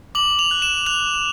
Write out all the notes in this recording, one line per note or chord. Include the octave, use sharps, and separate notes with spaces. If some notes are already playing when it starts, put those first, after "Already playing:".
D6 F#7
F7
F#6
E7
F#6 F7